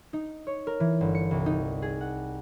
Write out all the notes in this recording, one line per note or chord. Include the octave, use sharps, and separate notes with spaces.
D#4
C#5
A#4
E3
G1
C#7
C2
D#4
G#4
F#5